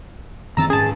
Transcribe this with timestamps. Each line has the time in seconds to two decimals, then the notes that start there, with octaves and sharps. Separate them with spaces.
0.57 F#2 D#3 C4 A#5 E6 A6
0.70 G#2 C#4 G#4 A5